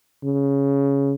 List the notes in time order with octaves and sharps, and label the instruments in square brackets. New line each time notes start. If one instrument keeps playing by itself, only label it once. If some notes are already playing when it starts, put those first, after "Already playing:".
[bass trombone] C#3